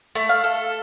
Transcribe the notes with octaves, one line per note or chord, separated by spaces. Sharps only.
A3
F5
A4